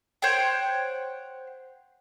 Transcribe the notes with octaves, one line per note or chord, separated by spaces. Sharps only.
C5 C#5 F#5 G5